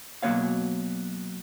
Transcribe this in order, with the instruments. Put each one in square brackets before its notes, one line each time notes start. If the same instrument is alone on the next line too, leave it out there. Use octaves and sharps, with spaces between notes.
[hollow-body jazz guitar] B2 F#3 A3 A#3 C#5 F5